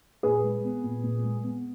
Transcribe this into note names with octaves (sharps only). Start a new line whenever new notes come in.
A#2 G#4 B4
G#3
B3
A#2
A#2
G#3
B3